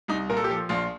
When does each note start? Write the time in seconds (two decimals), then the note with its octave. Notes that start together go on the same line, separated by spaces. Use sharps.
0.08 C2 D#4
0.29 A#2 A#4
0.37 A4
0.44 G4
0.49 F3 A4
0.69 A#1 F4